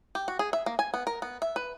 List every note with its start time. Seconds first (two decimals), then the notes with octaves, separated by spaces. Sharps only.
0.15 G4
0.28 F#4
0.39 G#4
0.53 E5
0.66 A#3
0.79 G#5
0.94 B3
1.07 A#4
1.22 B3
1.42 E5
1.56 B4